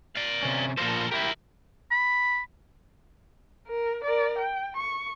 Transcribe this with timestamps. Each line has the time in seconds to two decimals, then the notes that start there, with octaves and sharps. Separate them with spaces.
0.16 D5 F5
0.43 C3 C#4
0.78 A#2 F3 A4 A#4 C5
1.12 E4 G4 A#4 E5
1.91 B5
3.67 A#4
4.04 A#4 D5
4.38 G5
4.77 C#6